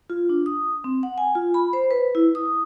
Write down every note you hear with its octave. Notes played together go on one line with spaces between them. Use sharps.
F4
D4
D#6
C4
F#5
G#5
F4
B5
C5
B4
E4
D#6